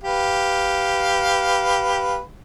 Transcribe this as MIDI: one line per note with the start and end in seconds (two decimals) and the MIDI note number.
0.04 2.20 67
0.04 2.20 71
0.04 2.20 77